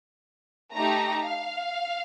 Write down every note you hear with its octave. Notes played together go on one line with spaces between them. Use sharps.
A3 D#4 G4 A#5
F5